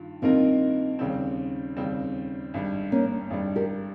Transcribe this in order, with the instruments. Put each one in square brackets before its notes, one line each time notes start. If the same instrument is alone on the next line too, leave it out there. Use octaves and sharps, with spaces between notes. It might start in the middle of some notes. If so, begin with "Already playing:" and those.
Already playing: [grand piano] G2 D#3 F4
[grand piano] G2 D#3 A#3 F4 A#4 [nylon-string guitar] C4 D#4
[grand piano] D#2 C#3 G3 C4
D#2 C#3 G3 C4
G#1 G2 G3
[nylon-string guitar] A#3 C#4
[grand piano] G#1 G2 G3
[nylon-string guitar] G4 A#4